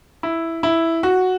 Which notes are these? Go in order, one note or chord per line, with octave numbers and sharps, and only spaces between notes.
E4
E4
F#4